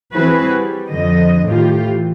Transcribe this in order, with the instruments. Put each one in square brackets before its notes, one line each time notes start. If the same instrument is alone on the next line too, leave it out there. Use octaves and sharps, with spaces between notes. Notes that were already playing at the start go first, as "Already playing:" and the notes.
[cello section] E3 C4 E4 F#4 G#4 B4
G3
F2 D3 D#5
A2 D#3 F4 G4
E3